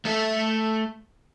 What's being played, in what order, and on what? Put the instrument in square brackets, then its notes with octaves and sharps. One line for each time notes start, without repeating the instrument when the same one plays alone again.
[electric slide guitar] A3 A4 E5